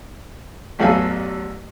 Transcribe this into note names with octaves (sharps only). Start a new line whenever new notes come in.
A1 E2 F#3 A4 F5 G#5